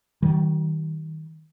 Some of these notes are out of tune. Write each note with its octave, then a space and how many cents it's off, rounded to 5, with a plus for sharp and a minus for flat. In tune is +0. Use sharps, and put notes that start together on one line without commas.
D#3 +20 G3 -40